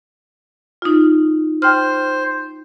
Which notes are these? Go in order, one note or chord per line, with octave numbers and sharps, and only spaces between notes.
D#4 F4
C5 G5 F6